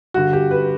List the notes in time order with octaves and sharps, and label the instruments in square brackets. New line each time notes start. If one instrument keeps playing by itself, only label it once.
[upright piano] G2 D3 F#4
G4
B4